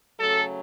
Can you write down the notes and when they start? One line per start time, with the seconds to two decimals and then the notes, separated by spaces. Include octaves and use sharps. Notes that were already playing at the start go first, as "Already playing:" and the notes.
0.18 C#3 F#3 A3 C#4 A4